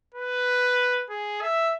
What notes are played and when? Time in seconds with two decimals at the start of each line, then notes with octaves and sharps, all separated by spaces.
0.14 B4
1.10 G#4
1.41 E5